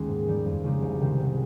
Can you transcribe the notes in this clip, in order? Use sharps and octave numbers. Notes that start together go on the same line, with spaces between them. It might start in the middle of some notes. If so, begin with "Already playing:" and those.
Already playing: D#2 D#3 G#3 A#3 C#4
G#2
D#3 G3
F2
C#3 G#3 D#4 G4
C2
C3 D#3 G#3 C4
G#1